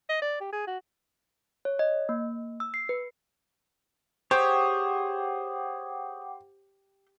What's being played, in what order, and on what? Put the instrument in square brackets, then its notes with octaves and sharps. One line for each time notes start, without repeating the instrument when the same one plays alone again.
[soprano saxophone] D#5
D5
G4
G#4
F#4
[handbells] C#5
D#5
A#3
E6
C7
B4
[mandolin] G4 [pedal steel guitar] G#4 C#5 [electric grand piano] C5 [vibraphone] F#5 G5 D6